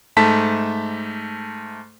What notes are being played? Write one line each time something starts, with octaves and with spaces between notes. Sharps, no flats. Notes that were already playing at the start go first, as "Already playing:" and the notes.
G#2 A3 A5 B6